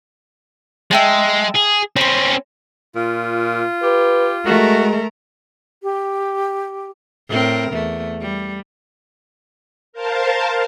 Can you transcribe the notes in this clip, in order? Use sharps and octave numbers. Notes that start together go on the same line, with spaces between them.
G#3 E5 G5 A5
G#4
C4 C#4 B5 C6
A#2 F4
G4 B4
G#3 A3 F#4 A#4
G4
A2 C4 A#4
E2 A3
G3
A#4 C5 F5 A5